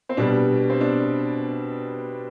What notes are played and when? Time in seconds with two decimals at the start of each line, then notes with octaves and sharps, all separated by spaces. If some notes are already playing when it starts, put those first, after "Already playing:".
0.09 C4
0.17 B2 G3 D4
0.70 C4
0.81 D4